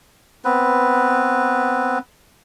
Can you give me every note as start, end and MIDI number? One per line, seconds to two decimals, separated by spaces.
0.45 1.99 59
0.45 1.99 60
0.45 1.99 71